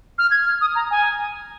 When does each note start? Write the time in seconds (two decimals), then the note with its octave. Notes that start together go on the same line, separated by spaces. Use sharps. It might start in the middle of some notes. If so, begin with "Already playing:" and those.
0.18 F6
0.31 G#6
0.45 F6
0.61 D#6
0.75 A#5
0.91 G#5